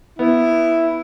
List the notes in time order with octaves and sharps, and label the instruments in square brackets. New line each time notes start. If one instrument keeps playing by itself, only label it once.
[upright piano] B3 [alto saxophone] E4